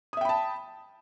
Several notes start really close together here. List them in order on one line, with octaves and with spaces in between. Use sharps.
D#6 E5 G5 B5 A5